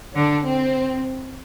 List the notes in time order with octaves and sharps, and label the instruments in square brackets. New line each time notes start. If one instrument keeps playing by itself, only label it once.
[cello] D3 [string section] D4
[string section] C4